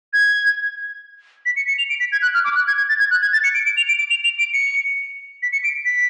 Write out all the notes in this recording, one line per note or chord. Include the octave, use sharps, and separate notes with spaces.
G#6
B6
C#7
C#7
F7
D7
B6
G#6
F#6
F6
D6
F#6
G#6
G#6
A6
G#6
F#6
G#6
A6
C#7
D7
D7
F7
D7
D7
F7
F7
D7
C#7
B6
C#7
D7
B6